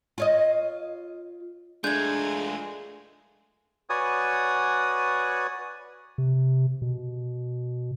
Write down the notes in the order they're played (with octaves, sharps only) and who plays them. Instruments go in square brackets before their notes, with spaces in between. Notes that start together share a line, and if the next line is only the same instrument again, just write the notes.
[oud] F4 C#5 D#5
[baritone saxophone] G#3 [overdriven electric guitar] A3 F4 [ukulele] D4 [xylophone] G6 G#6
[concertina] F#4 B4 C#5 D5 G#5 D#6
[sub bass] C3
B2